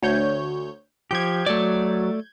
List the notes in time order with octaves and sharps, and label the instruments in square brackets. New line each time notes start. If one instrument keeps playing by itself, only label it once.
[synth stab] D2 C#5 G6
[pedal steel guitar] F3 G4 [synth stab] G6 G#6
[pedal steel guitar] F#3 [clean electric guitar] A3 D5